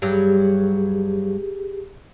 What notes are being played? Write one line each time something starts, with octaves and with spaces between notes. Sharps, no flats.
G2 F#3 G3 G4 G#4